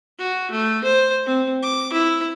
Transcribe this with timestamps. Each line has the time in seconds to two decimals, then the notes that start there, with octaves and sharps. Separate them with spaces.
0.19 F#4
0.51 A3
0.84 C5
1.26 C4
1.63 D6
1.93 E4